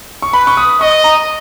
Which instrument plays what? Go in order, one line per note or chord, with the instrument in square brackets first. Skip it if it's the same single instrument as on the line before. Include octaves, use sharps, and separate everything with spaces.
[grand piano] C#6
[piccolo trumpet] B4 [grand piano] B5
[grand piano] C#6
D#6
[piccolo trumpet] D#5 [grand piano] C#6
[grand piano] A#5